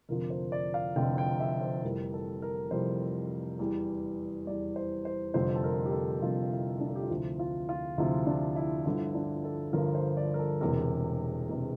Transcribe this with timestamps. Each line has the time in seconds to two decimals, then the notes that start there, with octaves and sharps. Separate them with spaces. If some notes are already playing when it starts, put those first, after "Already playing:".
0.09 F1 F2 D3 F3 A#4
0.30 C5
0.52 D5
0.74 F5
0.96 F1 F2 D3 F3 G5
1.18 G5
1.40 E5
1.61 C5
1.83 F1 F2 E3 G3 A#4
2.14 A4
2.42 A#4
2.71 F1 F2 E3 G3 C5
3.59 E2 E3 G3
4.47 E2 E3 G3 D5
4.76 C5
5.05 C5
5.34 F1 F2 D3 G3 C5
5.55 A4
5.64 A#4
5.86 G4
5.93 A4
6.22 F1 F2 D3 G3 F4
6.51 E4
6.80 D4
6.89 A4
6.96 G4
7.03 F4
7.10 D2 C3 F3 E4
7.39 F4
7.69 F4
7.98 D2 C3 F3 E4
8.27 D4
8.56 E4
8.81 F4
8.86 G1 G2 D3 F3 E4
9.15 D4
9.44 A4
9.73 G1 G2 D3 F3 A#4
9.95 C5
10.17 D5
10.34 A#4
10.39 A4
10.61 E1 E2 C3 A#4
11.49 E1 E2 C3